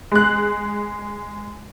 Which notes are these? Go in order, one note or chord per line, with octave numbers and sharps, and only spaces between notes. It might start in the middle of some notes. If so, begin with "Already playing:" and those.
G#3 F#6